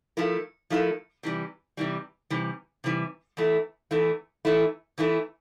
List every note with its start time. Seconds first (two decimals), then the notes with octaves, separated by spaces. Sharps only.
0.17 F3 A3 E4 A#4
0.70 F3 A3 E4 A#4
1.23 C3 E3 G3
1.77 C3 E3 G3
2.30 C3 E3 G3
2.84 C3 E3 G3
3.37 E2 E3 A3 E4
3.91 E2 E3 A3 E4
4.45 E2 E3 A3 E4
4.98 E2 E3 A3 E4